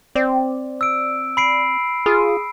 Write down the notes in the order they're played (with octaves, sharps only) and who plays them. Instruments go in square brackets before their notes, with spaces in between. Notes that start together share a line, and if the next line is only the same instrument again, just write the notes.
[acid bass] C4 [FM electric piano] D5
[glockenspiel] E6 D7
B5 C7 D7
[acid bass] F4 [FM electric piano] G#4 D#6